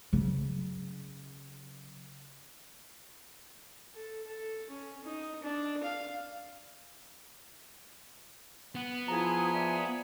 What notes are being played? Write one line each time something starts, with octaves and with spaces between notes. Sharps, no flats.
C#3 F#3
A4
A4
C#4
D#4
D4
F5
B3
F3 E4 G#4 A#5 D#6
G#4 D5 E5